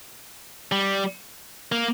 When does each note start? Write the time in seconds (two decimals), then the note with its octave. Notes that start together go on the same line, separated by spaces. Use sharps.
0.72 G3
1.72 A#3